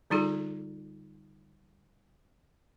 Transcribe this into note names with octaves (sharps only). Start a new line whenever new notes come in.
D3 G3 D#4 F4 G#4 A4